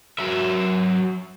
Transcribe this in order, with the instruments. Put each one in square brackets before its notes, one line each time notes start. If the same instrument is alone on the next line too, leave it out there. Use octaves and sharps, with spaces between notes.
[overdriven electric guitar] F#3 E5